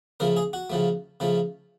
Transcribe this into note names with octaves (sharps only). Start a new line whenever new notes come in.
C#3 F3 A3 A#4
G#4
F#4
C#3 F3 A3
C#3 F3 A3